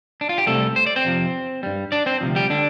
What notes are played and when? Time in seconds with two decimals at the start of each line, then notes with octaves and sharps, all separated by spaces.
0.21 D4
0.29 F4
0.38 G4
0.47 C2 C3 G3 A3 A4
0.76 C5
0.86 D5
0.96 C4 C5
1.05 F2 C3 F3
1.63 G2 G3
1.92 D4 D5
2.06 C4 C5
2.21 D2 C3 F3
2.35 G3 G4
2.50 D3 D4